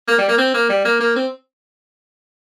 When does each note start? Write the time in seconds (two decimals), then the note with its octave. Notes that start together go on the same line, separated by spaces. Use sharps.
0.08 A#3
0.19 G3
0.29 A#3
0.38 C4
0.54 A#3
0.70 G3
0.85 A#3
1.00 A#3
1.16 C4